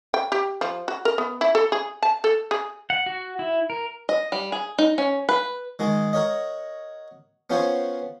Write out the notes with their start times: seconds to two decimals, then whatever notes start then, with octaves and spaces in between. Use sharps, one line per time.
0.14 G5
0.32 G4
0.61 F3
0.88 F#4
1.05 A#4
1.18 B3
1.41 E4
1.55 A4
1.72 G#4
2.03 A5
2.24 A4
2.51 G#4
2.90 F#5
3.06 F#4
3.39 E4
3.70 A#4
4.09 D#5
4.32 G3
4.52 G#4
4.78 D#4
4.98 C#4
5.29 B4
5.79 D#3 G#3 F#4 G#4
6.13 F#4 A#4 C#5 D#5
7.50 B3 C#4 F4 F#4 C5 C#5